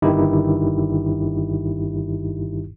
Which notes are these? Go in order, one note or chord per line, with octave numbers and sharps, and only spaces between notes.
G1 G2 D#3 D#4 E4 G4